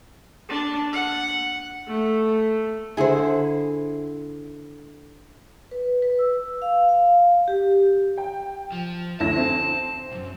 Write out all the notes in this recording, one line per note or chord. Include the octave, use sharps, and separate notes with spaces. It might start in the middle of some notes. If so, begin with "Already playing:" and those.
D4
F#5
A3
D3 E4 G#4 C5
B4
B4
E6
F5
F5
G4
G5
F3
D2 E4 A5 A#6
C4 E7
C2 F#2